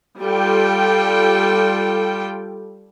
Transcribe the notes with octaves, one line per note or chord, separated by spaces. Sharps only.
G3 F4 A4 G5